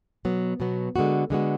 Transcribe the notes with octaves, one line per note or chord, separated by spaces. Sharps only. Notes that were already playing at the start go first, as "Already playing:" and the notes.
B2 F#3 B3
B2 F#3 B3
D3 G#3 B3 F#4
D3 G#3 B3 F#4